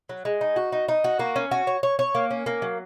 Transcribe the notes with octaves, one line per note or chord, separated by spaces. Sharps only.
F#3
G#3
D#4
F#4
D#4
D#4
F#4
A#3
C#4
F#4
C#5
C#5
C#5
A#3
C#4
A#3
F#3